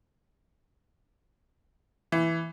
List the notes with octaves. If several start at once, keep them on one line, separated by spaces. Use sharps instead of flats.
E3